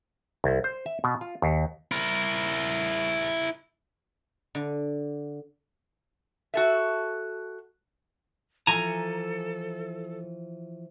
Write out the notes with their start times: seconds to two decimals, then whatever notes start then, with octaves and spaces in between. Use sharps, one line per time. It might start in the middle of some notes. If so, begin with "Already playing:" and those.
0.44 C2
0.64 C5
0.86 E5
1.04 B2
1.21 F4
1.42 D#2
1.92 E4 A#4
4.55 D3
6.54 F#4 A4 E5
8.67 E3 F3 A4 G#5 A#5